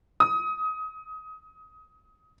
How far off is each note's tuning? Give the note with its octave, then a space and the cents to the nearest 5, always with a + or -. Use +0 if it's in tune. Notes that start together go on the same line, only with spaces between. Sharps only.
D#6 +25